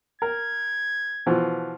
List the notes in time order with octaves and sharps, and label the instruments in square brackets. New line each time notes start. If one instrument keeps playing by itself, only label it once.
[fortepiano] A#4 [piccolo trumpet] G#6
[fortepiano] B2 E3 F3